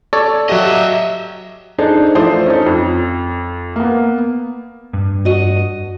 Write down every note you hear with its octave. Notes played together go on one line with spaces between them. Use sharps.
A4 C#5 D5
F#3 F#4 G4 D#5 E5
D4 D#4 G#4 A4 C5
E3 F3 A3 C5 D5 D#6
C#4 D#4 A4
F2
A#3 B3
G2
F#4 D#5